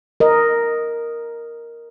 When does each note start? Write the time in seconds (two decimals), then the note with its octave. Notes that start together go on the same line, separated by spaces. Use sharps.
0.20 A#4 D#5